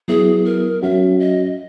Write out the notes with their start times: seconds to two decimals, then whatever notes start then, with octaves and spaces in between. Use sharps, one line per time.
0.08 F#3 B3 E4 G#4
0.45 A#4
0.82 F#3 C#4 F#4 E5
1.20 D#5